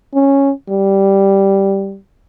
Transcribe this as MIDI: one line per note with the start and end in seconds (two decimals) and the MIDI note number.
0.14 0.51 61
0.69 1.97 55